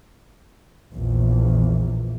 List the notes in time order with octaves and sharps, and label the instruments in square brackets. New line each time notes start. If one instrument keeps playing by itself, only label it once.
[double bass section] A#1 E2